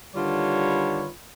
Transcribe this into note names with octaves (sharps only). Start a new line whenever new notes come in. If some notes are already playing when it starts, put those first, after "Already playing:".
D3 D#3 G3 F4 B4 C#5